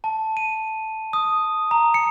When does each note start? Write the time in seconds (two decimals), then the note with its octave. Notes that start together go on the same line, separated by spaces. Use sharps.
0.04 A5
0.37 D#7
1.13 D#6
1.71 A#5
1.94 C#7